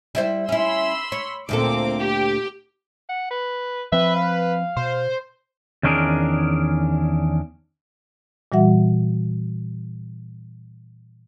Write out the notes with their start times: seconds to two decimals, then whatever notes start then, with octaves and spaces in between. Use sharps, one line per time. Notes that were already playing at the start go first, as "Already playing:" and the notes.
0.15 G3 E4 C5
0.49 C#4 E4 B5 C6 E6
1.12 C#5
1.49 D2 A#2 A#3 C4 A4 D6
2.00 G4
3.09 F#5
3.31 B4
3.92 F3 C4 B4 E5
4.16 F5
4.77 B2 C5
5.83 E2 D#3 C#4 D4 G#4 A#4
8.52 A#2 E3 G3 F#4 E5 F#5